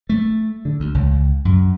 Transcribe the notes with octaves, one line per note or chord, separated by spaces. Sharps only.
A3
D3
D2
C#2
F#2